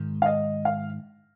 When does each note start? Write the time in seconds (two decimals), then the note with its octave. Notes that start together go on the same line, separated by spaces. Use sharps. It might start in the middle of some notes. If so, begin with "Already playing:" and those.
Already playing: G#2 D#3 G#3
0.22 F5
0.26 D#5
0.65 F5